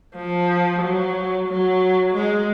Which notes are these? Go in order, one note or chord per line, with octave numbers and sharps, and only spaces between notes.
F3
F#3
F#3
G#3